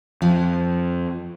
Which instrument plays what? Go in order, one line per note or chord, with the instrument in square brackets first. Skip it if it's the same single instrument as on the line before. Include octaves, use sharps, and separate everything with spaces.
[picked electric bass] F2 [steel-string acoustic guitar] F3